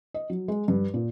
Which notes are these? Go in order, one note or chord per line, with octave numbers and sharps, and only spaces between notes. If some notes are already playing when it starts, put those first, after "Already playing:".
D#5
F#3
G#3
G2
A#2